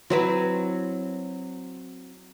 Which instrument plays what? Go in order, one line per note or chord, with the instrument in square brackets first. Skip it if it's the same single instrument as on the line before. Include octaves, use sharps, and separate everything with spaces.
[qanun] F#3 [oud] C4 E4 B4